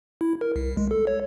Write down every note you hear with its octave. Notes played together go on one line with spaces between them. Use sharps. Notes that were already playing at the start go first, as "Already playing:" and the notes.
E4
A#4
C2
G#3
A4
C#5